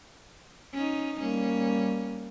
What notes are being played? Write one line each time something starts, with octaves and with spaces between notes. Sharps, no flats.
C#4 D#4
G3 A#3 C#4